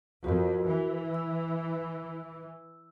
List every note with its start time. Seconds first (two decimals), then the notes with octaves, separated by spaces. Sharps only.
0.24 F2 F#4 A#4
0.67 E3
1.14 E6